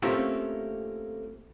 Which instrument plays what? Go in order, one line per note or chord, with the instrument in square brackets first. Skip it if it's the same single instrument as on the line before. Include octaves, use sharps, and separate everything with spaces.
[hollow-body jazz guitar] A3 A#3 C4 C#4 F4 G4